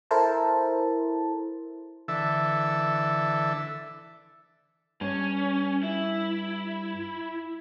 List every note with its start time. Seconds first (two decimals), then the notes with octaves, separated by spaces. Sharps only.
0.11 E4 A4 A#4 C5 A5
2.08 D3 E3 A4 E5
5.01 G2 C#4
5.83 E4